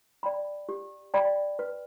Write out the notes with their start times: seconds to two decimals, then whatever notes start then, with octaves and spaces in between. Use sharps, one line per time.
0.23 D5 G5 B5
0.69 G4
1.14 D5 G5 B5
1.59 B4